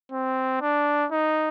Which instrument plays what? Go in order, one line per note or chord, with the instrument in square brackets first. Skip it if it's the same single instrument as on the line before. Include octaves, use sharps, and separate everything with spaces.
[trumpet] C4
D4
D#4